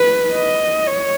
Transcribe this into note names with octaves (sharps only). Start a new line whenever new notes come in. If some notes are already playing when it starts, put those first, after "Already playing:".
Already playing: B4
D#5
C#5